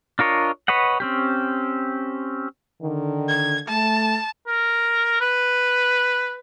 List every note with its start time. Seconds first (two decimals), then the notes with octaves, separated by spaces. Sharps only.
0.19 D4 F4 A#4 C#5 D#5
0.68 B4 C#5 D#5 F#5
1.00 C4 C#4 G4
2.82 D3 D#3
3.29 G#6
3.68 A3 A5
4.47 A#4
5.21 B4